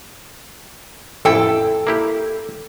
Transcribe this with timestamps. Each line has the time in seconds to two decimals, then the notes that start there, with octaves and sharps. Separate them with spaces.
1.25 A1 F2 E4 A4 G5
1.87 A#3 E4 G4